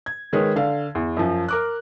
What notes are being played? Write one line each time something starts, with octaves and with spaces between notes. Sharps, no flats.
G#6
D#3 G#3 G#4 B4 C#5
D3 F5
E2
F#2 F3
A#4 D6 F#6